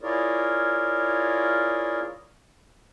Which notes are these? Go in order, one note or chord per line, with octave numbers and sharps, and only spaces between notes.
E4 F4 G#4 A#4 C#5 D5